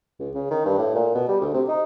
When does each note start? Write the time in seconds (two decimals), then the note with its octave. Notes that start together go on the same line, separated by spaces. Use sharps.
0.19 C#2
0.35 C#3
0.50 D#3
0.66 G2
0.78 A2
0.95 A#2
1.15 B2
1.28 G3
1.40 D2
1.54 C3
1.68 D#4